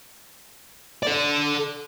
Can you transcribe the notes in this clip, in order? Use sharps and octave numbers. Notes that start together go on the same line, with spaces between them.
A4 D5